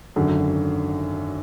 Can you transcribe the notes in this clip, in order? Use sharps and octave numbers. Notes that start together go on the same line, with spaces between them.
G#1 F#2 D3